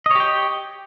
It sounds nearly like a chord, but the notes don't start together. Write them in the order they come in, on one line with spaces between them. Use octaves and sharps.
D#5 C#5 G4 G5